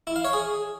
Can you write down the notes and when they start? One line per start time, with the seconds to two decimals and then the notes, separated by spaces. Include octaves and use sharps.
0.07 E4
0.16 F5
0.25 C#5
0.33 G#4